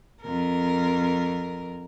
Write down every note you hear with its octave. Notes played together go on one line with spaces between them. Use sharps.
F2 A#4